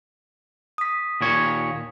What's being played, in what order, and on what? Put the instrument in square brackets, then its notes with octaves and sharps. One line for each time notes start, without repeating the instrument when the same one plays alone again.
[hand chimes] D#6 B6
[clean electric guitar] D#2 A#2 C#5